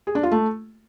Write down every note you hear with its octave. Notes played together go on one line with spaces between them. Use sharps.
G#4
D4
F4
A3